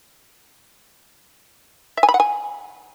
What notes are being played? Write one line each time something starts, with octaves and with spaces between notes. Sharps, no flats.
E5
G#5
B5
F#5
G#5